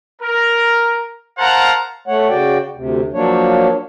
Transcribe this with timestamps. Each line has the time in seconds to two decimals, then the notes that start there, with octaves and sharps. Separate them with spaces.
0.22 A#4
1.38 A#4 C5 F5 F#5 A5 A#5
2.08 A3 C#5 F#5
2.29 C#3 F#4 D5 G5
2.76 D2 C3
3.13 F3 F#3 A#3 D4 C#5